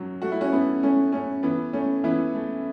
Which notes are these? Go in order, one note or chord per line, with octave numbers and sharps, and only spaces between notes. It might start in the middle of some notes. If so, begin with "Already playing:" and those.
Already playing: F#2 F#3
A3 F#4
E4
C#4 F#4
A3 B3 E4
A3 C#4
A3 C#4
E3 B3
A3 C#4
E3 B3 E4
A3